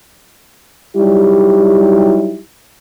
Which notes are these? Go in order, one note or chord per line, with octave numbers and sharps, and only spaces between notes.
F#3 G3 D#4 E4 G4